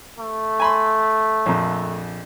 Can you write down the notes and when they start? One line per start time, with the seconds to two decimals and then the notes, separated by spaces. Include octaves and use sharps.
0.19 A3
0.60 G#5 B5 C6
1.46 A#1 F2